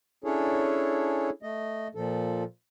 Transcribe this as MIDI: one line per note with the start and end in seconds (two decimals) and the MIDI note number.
0.24 1.30 61
0.24 1.30 62
0.24 1.30 64
0.24 1.30 68
0.24 1.30 69
0.24 1.30 73
1.43 1.88 57
1.43 1.88 75
1.95 2.44 46
1.95 2.44 53
1.95 2.44 69